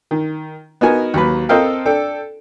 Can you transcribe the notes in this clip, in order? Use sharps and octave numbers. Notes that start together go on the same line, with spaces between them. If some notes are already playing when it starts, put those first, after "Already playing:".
D#3
B3 D#4 F#4 A#4 G#5
D#2 F#3 B4
C4 A4 A#4 D#5 F5 G5
D4 A4 G5